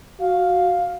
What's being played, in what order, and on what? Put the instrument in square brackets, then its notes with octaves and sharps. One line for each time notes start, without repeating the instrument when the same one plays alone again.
[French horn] F#4 [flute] F5